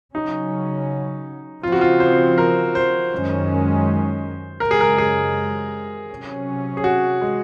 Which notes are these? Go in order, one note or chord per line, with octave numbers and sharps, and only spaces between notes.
C#3 F#3 C#4 D#4
C#3 F3 C4 F4
F#4
F4
C5
A#4
C5
F#2 D#3 G#3 C#4
F#2 C#3 G#3 A#4
G#4
A#4
G#4
C3 F#3 C#4
G#4
F#4
G#3